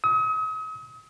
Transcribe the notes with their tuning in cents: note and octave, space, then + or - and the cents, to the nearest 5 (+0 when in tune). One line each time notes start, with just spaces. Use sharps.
D#6 +40